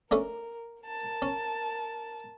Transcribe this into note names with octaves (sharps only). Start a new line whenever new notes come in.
A3 C#4 D4 A#4
A#4 A5
C#4